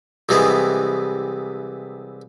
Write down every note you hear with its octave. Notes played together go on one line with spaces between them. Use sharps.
C2 C3 E3 G#3 B3